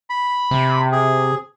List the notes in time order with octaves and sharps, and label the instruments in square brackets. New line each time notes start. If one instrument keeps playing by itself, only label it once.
[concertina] B5
[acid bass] C3
[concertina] G#4